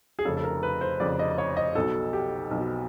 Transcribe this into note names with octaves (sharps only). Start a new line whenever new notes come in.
G#4
F1 F2 C#3 A4
A4
A#4
B4
C5
F1 F2 C#3 D5
D#5
C#5
D#5
B1 B2 A4
G4
B1 B2